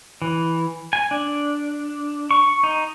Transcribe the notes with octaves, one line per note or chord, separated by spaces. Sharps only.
E3
G#5
D4
C#6
D#4